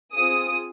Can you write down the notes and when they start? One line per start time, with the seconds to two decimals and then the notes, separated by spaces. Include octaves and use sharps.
0.13 C4 F4 G#4 D#6